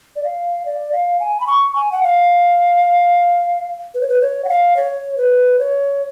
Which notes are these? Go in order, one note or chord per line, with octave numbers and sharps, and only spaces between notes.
D5
F5
D5
F5
G#5
B5
C#6
G#5
F#5
F5
B4
C#5
B4
C#5
F#5
F5
C#5
B4
C#5